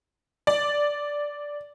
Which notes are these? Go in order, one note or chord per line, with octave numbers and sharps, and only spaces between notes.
D5